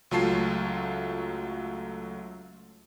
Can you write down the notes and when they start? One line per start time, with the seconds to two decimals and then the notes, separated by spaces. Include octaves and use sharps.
0.11 C#2 F#3 A3 F4 A5 C7